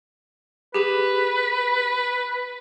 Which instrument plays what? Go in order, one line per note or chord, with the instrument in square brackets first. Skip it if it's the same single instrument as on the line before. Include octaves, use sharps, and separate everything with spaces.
[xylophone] G4 G#4 E7 [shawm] B4